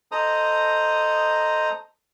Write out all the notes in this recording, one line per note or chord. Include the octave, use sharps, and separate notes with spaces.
A4 C5 D#5 A#5 D#6